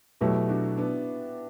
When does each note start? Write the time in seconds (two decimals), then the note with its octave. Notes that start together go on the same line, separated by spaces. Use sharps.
0.21 B2 F#3 A3 E4 G4
0.49 D4 F#4
0.78 B3 D4